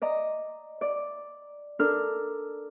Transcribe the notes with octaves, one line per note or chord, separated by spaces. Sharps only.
D5 D#5 A#5
D5
D4 A4 A#4 F6